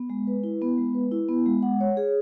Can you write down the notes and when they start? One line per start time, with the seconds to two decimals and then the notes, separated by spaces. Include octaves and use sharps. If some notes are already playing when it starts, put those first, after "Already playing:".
Already playing: B3
0.10 G#3
0.27 B4
0.44 E4
0.62 B3
0.78 G#3
0.95 B4
1.11 E4
1.29 B3
1.46 G#3
1.63 F#5
1.80 C#5
1.97 G#4